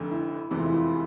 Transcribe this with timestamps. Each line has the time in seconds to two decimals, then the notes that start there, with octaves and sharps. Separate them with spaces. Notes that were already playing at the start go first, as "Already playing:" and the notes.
Already playing: F1 F2 D3
0.11 E4
0.50 F1 E2 C3 E3 G#3
0.59 F4
0.66 E4
0.74 F4